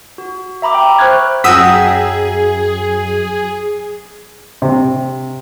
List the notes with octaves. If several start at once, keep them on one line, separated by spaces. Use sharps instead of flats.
F#4
E5 A#5 B5 D6
G5
C5 C#6 F6 F#6 G#6
F#2 G#4 F#5 G5 A#5 D#6 E6 B6
C3